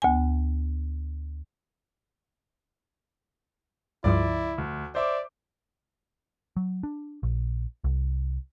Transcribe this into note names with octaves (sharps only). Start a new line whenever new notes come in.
D2 B3 G#5
C#2 G2 F3 E4 D5
D2
C5 D5 E5 D6
F#3
D4
A#1
C2